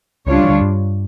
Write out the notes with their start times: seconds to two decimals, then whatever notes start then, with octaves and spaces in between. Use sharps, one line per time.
0.26 C#2 C#3 G3 D4 F4 C#5
0.44 E3
0.49 D2 D3
0.61 G2 G3